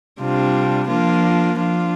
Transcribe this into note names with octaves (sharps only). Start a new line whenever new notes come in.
C3 G3 D4 F4
F3 A#3 D4 F4
F3 D4 F4